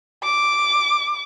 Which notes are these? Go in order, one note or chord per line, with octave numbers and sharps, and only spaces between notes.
D6